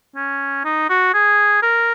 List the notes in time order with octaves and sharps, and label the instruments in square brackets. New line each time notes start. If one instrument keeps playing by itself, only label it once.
[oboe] C#4
D#4
F#4
G#4
A#4